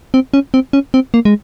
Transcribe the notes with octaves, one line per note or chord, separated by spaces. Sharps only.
C4
C#4
C4
C#4
C4
A#3
G#3